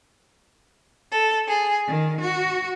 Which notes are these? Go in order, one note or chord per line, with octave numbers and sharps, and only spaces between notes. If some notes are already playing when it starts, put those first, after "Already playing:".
A4
G#4
D#3
F#4